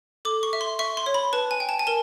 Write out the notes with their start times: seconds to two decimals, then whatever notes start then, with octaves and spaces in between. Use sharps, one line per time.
0.25 A4 D6
0.43 C#6
0.53 E5
0.61 C6
0.79 E5 C#6
0.97 C6
1.06 C#5
1.14 B5
1.33 B4 A5
1.51 G#5
1.60 G5
1.69 A5
1.79 G#5
1.87 A#4 A5